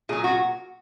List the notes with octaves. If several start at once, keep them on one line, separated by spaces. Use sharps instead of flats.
A#2 F#3 G#4
F#4